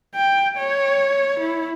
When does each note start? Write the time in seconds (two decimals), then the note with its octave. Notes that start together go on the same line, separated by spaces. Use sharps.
0.15 G5
0.57 C#5
1.40 E4